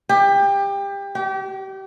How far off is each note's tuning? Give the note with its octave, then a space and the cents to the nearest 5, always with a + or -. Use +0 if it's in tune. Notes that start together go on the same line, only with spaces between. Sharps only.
G4 +25
G4 -30